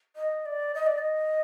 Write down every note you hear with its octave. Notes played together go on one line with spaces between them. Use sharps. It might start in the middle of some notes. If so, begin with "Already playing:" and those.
D#5
D5
D#5
D5
D#5